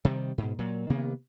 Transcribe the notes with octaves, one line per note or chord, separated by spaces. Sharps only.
C3 D#3 G3
G#2 B2
A#2 F#3
C3 D#3 A#3 B3